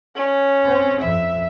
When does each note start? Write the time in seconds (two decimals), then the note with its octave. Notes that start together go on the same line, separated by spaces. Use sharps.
0.16 C#4
0.64 C4
1.02 F2 E5